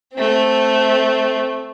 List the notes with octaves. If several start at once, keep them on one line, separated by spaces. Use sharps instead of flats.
A3 C4